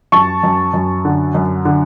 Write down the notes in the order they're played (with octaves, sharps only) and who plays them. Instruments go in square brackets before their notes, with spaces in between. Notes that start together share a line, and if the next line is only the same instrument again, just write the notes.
[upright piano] F#2 A5 C#6
F#2
F#2
D3
F#2
D3